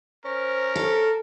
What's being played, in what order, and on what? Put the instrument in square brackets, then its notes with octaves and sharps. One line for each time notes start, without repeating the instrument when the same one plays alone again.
[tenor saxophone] C#4 [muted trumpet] A#4 [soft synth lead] C5
[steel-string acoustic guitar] A4